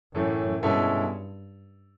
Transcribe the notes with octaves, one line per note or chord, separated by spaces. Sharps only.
F#2 A2 E3 A3
G2 B2 G#3 C#4 E4 A4